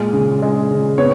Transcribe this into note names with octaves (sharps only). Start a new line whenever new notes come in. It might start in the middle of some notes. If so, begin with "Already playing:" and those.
Already playing: A#2 G#3
C#3
G#3
C#3
B3 C#5